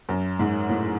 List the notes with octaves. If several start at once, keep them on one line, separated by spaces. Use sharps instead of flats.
F#2
G#2
A2